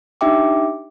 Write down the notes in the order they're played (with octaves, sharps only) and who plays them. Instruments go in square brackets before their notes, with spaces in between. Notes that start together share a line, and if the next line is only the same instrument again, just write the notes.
[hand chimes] D4 D#4 G4 E5 G5 D6